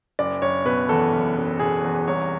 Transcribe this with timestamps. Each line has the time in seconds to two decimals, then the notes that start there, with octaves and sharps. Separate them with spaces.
0.19 F#1 D5
0.42 F#1 C#5
0.65 B2 B4
0.89 E2 A4
1.13 F#1
1.37 F#1
1.59 B2 G#4
1.84 E2
2.07 C2 C#5